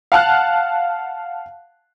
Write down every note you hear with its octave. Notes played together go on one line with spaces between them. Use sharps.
F5 F#5 A5 F6 F#6